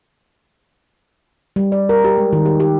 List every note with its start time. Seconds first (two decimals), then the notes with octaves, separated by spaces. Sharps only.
1.56 G3
1.72 D5
1.89 A#4
2.04 G4
2.18 G#3
2.33 D#3
2.45 G4
2.60 G4